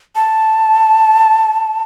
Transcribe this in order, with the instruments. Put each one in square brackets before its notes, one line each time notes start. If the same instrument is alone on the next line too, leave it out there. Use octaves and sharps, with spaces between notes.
[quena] A5